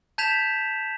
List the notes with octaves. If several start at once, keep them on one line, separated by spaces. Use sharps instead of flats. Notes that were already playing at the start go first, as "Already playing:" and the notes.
A5 G6 G#6 B6 E7 F7